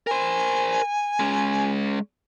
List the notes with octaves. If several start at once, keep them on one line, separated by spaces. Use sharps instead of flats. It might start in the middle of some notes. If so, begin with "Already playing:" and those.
A#4 C5 G#5
G#3 C#4